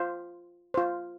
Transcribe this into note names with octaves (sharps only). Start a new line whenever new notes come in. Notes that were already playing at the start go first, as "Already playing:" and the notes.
Already playing: F4 C5
F4 C5